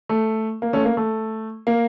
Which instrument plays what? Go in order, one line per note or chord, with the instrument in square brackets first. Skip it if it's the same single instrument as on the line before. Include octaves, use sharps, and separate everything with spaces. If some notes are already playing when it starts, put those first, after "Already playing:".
[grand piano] A3
A#3
A3 C#4
A#3
A3
A#3